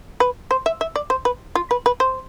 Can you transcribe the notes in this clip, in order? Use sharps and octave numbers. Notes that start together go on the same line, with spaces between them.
B4
C5
E5
E5
D5
C5
B4
F4
B4
B4
C5